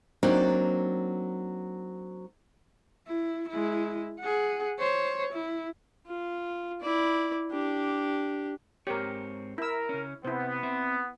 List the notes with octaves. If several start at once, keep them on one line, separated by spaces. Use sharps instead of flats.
F#3 A#3 C4 D4 D#4
E4
G#3 E4
G#4 F#5
C5 C#5
E4
F4
E4 D5
D4 G4
G#2 C4 G4 A#4 C#5
E4 A#4 E6
C#3 C#4
C3 B3 E4 C5
C4 E5